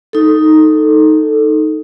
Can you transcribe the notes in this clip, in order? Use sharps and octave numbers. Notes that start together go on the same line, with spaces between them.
D#4 A4